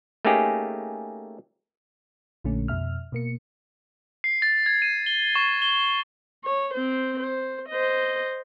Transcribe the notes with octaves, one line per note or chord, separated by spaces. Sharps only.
A3 A#3 C#4 D#4 G4 G#4
A#1 A#2 D3 A3 C#4
F2 B2 E5 F6
B2 A#3 C#7
C7
A6
G#6
D#7
G7
C#6
G7
C#5
C4 C5
C5
C5 D#5